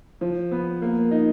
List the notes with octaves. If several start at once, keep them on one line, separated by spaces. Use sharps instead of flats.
F3
B3
A#3
D#4